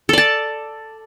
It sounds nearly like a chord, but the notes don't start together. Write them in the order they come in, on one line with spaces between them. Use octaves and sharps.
A4 D5 A5